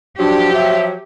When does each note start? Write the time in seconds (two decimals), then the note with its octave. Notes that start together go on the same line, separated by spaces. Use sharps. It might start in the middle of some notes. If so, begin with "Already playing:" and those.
0.19 F3 F#3 D4 G4
0.54 E5